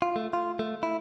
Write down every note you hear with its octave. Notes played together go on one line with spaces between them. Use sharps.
F4
A3
F4
A3
E4